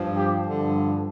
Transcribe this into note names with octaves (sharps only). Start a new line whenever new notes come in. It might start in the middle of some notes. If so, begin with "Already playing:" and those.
Already playing: G2 F3
G4
G2 D3 F3